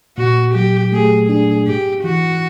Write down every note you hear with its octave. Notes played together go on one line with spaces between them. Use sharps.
A#2 F#4
F#3 G4
A3 G#4
D4 G#4
G#2 G4
E3 F#4